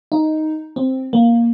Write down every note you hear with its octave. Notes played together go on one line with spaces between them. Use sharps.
D#4
C4
A#3